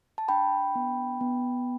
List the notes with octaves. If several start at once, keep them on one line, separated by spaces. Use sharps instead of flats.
A5
D4 G5 B5
B3
B3